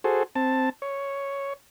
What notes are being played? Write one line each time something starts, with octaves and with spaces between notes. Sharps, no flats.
F#4 G#4 A4 C5
C4 A5
C#5